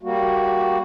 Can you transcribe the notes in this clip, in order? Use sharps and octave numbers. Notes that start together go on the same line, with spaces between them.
G3 A#3 F#4